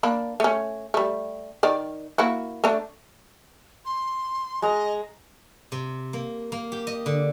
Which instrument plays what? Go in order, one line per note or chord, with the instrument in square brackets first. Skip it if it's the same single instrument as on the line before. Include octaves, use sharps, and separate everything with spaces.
[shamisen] A#3 D4 B5
A3 C#4
G3 A3
D#3 D5
A#3 E4 F#4
A3 D4
[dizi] C6
[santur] G#3 A#5 [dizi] D#5
[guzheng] C3
A#3
A#3
G4
D#5
D3